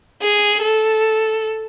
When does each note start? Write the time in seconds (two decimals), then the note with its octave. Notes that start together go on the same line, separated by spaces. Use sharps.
0.22 G#4
0.62 A4